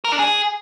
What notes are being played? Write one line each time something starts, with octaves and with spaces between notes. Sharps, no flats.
A#4
D4
G#4